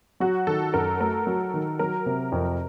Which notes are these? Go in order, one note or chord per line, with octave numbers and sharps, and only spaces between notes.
F#3 F#4
D#3 A4
F#2 A#4
A3 A#4
F#3
D#3
F#3 A#4
C3
F2